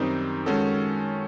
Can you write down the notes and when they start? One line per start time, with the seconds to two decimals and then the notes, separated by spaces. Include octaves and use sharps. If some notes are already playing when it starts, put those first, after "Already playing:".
Already playing: F#2 D#3 G3 C4 D#4
0.46 D#3 G#3 C#4 F#4 A4